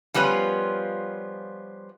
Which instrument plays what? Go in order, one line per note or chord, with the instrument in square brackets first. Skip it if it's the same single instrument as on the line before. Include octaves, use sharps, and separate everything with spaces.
[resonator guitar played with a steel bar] F3 G3 B3 C#4 F4